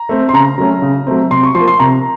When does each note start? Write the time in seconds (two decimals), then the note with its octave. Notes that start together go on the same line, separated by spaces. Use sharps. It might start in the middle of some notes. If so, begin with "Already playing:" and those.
Already playing: A#5
0.09 A3 C4
0.29 C6
0.33 C#3 A#5
0.58 F#3 A3 C#4
0.82 C#3
1.07 F#3 A3 C4
1.31 C3 C6
1.43 C#6
1.55 F3 C6
1.60 A#3
1.68 C6
1.80 C3 A#5